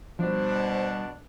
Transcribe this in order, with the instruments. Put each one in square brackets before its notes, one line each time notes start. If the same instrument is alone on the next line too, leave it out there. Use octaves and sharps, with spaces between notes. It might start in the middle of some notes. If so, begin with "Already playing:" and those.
[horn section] B2 D4 [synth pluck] F3 [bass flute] G3 [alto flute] C5